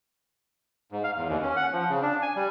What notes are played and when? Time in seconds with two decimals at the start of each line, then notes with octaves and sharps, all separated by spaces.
0.92 G#2
1.04 F5
1.16 E2
1.28 D#2
1.43 C#4
1.56 F#5
1.73 F3
1.90 C#3
2.02 D4
2.22 G#5
2.36 G3